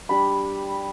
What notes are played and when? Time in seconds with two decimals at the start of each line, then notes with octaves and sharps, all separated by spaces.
0.09 G3 D4 B5